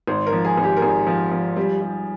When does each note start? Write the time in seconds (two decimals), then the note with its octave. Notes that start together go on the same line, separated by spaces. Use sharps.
0.07 G#1 C5
0.27 A#4
0.33 F3
0.45 G#4
0.57 G#1
0.63 G4
0.77 A#4
0.82 G#1 G#4
1.07 F3
1.31 F3
1.56 G3
1.81 G3